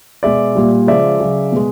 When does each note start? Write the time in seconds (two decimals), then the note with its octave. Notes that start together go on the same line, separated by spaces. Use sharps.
0.23 B2 G#3 D5 E5
0.55 A#2 G3
0.87 C#3 F3 G#3 D5 E5
1.20 C#3 F#3
1.52 B2 G#3